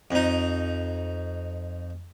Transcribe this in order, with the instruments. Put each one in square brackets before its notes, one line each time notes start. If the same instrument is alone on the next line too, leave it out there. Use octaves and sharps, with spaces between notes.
[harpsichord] F2 D#4